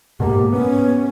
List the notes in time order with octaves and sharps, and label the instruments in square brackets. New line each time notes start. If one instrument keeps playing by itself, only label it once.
[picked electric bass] G#2 B2 A#3 [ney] G4
[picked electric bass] B3 [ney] C#4